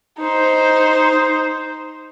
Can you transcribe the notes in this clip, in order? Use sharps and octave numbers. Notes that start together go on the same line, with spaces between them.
D#4 C5